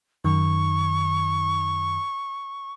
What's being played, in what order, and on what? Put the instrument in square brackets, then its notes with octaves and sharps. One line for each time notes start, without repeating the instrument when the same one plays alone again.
[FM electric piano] F#2 D#3 [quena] C#6